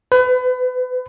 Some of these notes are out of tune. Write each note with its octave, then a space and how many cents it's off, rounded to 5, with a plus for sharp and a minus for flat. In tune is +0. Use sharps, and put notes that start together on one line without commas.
B4 +35